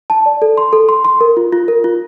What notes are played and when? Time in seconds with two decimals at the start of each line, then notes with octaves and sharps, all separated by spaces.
0.10 A5
0.26 D5
0.42 A4
0.58 C6
0.73 A4
0.89 C6
1.05 C6
1.21 A#4
1.37 F4
1.52 F4
1.68 A#4
1.84 F4